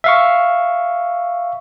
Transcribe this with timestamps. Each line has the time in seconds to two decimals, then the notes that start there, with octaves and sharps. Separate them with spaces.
0.04 E5 F5 C#6